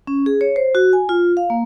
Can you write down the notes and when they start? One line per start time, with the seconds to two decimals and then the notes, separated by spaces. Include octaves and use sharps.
0.07 C#4
0.26 G#4
0.41 C#5
0.56 C5
0.75 F#4
0.93 G#5
1.09 F4
1.37 F5
1.50 A#3